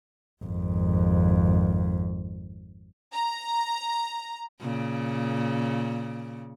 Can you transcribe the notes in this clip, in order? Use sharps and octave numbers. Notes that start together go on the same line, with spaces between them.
G#1 F2
A#5
A#2 C#3